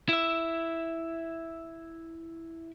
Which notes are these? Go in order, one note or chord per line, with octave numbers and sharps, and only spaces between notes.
E4 E5